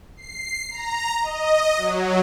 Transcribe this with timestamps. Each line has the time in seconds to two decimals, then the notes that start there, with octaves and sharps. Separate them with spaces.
0.17 C7
0.71 A#5
1.22 D#5
1.78 F#3